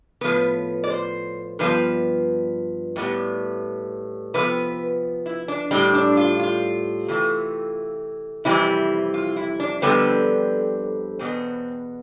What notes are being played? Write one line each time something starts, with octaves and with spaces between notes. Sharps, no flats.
A2 F3 B3 B4
D5
C5
G2 F3 B3 B4
A2 G3 B3
C3 F3 B3 B4
E4
D4
A2 G3 C4 D4
D4
F4
F4
C3 E3 A3
F2 C3 E3 G3 C4 E4
F4
E4
D4
F2 D3 G3 B3 C4
E2 B2 B3 C4